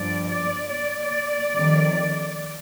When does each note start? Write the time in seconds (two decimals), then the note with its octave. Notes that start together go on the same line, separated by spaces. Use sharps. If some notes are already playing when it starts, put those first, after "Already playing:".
Already playing: G2 F3 D5
0.29 D5
0.70 D5
1.52 F2 D#3 G3